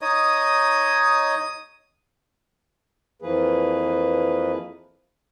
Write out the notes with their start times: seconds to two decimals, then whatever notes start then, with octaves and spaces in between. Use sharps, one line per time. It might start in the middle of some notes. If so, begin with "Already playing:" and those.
0.01 D#4 C#5 D#5 D#6
3.22 F2 E3 F3 A#3 G#4 B4